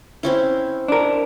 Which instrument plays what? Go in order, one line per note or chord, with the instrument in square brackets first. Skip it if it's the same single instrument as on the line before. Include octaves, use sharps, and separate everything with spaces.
[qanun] C4 C#4 E4
[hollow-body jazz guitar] D4 A#4